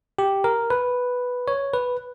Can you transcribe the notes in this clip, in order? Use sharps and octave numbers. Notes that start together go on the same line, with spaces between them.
G4
A#4
B4
C#5
B4